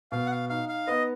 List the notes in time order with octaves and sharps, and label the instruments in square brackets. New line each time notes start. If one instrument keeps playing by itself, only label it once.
[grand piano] B2 [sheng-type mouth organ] F5
[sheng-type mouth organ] F#5
F5
[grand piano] D#4 [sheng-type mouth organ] F5
[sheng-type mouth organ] F5
[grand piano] B3 [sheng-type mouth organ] D#5